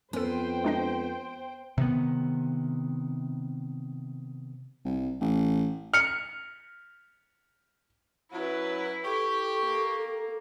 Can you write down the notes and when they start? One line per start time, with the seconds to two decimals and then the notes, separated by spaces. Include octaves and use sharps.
0.13 F2 B3 C#4 A4 C5 G5
0.64 G#3 D4 D#5
1.78 C3 D#3 B3
4.85 C2
5.21 A1
5.94 F6 C#7
8.32 F#2 F#3 E4 B4
9.05 G4 A4 C#6
9.64 A#3